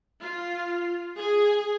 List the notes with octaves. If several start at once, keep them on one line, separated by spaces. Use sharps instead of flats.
F4
G#4